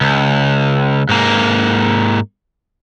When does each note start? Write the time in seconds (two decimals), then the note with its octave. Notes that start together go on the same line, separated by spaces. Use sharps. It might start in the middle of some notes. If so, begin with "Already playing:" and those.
0.01 C#2
1.09 G#2 A#3